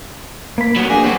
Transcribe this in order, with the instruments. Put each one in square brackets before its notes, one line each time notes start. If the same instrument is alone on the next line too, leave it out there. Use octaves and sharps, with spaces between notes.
[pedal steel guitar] A#3 B5
[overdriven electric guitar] C2 F#3 [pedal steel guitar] B3
[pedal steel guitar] A#3 D4 [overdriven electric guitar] G#4
[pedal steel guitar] G3 G#4 B4 [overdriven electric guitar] C4 F#4